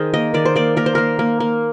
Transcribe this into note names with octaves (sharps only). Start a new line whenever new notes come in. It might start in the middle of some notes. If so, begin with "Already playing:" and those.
Already playing: D#3 G#4 A#4 C5
A#3 D#5
D#3 D5
C5
A#3 D5
A#3 A#4
C5
A#3 A#4
A#3
A#3